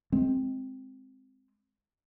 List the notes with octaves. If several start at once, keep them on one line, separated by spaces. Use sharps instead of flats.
G#3 C4